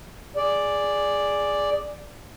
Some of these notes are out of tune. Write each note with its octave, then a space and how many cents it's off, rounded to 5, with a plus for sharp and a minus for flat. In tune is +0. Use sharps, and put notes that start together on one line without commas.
G#4 -5 D5 +0